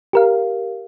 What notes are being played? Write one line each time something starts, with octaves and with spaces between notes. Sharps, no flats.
G4 A#4 F5